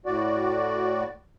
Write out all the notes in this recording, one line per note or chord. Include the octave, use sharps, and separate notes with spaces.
A2 F#4 D5